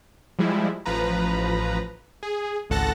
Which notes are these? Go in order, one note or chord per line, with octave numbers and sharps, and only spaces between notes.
F3 G3 G#3 E4
A1 F3 B4 A#5
G#4
G#1 C#2 A4 F#5 A5 A#6